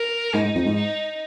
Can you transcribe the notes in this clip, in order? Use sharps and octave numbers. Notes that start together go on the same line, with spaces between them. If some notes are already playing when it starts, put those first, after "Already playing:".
Already playing: A#4
G#2 D#4
G#2
F2
G#2
D#4